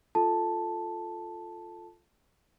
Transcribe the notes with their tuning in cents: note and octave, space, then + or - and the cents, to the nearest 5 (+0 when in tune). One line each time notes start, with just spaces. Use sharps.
F4 +0 A4 +0 A5 +0